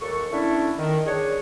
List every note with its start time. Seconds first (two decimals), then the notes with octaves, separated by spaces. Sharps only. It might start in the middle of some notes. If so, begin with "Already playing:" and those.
0.02 D#2 A4 C#6
0.32 D3 A3 C#4 D4 E4
0.78 D#3
1.06 D4 G#4 C#5